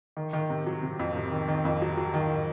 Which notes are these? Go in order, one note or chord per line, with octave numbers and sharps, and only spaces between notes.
D#3
D#3
C3
F#3
C3
F2
C3
D#3
D#3
F2
F#3
F#3
D#3